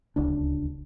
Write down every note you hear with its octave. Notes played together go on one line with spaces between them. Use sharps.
D1 C#2 D4